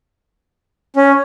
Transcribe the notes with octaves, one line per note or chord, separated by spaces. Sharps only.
C#4